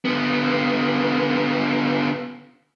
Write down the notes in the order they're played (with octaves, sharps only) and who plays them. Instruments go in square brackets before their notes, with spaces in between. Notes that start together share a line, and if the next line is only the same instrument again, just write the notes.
[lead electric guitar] D3 B3